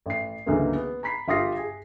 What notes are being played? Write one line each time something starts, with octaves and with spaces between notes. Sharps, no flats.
A1 C7
C#2 D3 E3 F#3 G#3 A#3
B3
A#5 B5 B6 C7
G1 F4 G4 D#6 A#6 C7
G#4